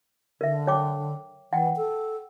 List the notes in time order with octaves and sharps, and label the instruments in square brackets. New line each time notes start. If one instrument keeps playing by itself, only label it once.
[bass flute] D3 [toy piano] A#4 E5
[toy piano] C#5 G5 D6
[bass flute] E3 [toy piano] F#5 G5
[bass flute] A4